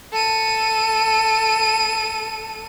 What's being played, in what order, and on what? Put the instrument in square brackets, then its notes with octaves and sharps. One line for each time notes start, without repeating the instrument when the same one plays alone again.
[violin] A4 D#7